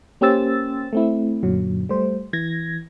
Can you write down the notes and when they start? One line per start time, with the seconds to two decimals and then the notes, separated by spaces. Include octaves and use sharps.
0.21 A#3 C#4 G4 C5 E6 A6
0.93 A3 C4 E4
1.43 F#2 A#2 D3 F#3
1.89 G3 A3 C5
2.33 E3 G#6 A#6